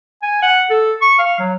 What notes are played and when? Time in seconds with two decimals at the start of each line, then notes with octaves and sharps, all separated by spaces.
0.23 G#5
0.42 F#5
0.70 A4
1.02 C#6
1.19 F5
1.39 F#3